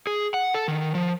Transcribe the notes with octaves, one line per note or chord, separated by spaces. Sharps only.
G#4
F#5
A4
D#3
F3